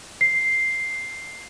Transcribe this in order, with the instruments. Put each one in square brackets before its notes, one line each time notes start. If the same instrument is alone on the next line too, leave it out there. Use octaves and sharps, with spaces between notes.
[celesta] C7